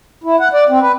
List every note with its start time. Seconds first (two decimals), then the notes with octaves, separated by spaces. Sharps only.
0.24 E4
0.40 F#5
0.53 D5
0.69 C4
0.82 B4